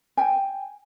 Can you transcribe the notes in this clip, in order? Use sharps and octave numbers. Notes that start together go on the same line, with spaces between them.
G5 G#5